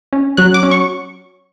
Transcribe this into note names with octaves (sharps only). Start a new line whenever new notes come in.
C#4
F#3 F#6
D6
C#4
C#6